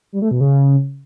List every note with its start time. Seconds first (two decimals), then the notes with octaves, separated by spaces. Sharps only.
0.13 G3
0.22 A3
0.31 B2
0.40 C#3